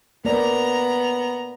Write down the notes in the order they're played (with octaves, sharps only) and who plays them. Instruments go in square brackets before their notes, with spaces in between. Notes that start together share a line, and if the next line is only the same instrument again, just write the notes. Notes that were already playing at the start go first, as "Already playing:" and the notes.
[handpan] A#3 D5 [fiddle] B3 A#5